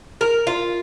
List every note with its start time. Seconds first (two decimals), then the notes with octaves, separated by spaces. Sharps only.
0.21 A#4
0.47 F4